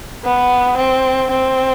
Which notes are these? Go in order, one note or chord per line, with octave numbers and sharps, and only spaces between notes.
B3
C4
C4